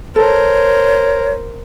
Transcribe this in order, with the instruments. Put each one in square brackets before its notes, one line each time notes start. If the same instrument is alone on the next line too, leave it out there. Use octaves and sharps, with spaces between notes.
[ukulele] A4 [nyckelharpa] A#4 C5 [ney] C#5